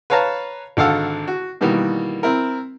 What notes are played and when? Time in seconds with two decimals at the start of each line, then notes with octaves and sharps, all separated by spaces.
0.10 B4 C#5 F5 A5 A#5
0.77 G#1 D3 A4 F5 F#5 E6
1.28 F#4
1.61 B2 D#3 E3 G3 A#3 F#4
2.23 C4 E4 A#4